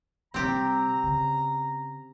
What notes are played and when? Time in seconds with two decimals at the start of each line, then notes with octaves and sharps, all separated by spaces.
0.34 C3 G3 C4 G4 A#5
1.04 C#3